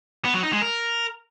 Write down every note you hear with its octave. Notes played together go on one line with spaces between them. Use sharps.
B3
F#3
D#4
G#3
A#4